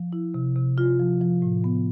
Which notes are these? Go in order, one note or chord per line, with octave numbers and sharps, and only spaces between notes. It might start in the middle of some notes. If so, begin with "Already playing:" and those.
Already playing: F3
E4
C3
C3
F4
F3
F3
A2
B3